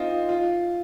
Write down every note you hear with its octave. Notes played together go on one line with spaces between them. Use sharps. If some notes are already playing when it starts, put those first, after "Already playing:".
Already playing: C4 D#4 F4
F4